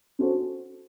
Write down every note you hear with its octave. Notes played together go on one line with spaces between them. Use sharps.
C#4 F#4 A4 C5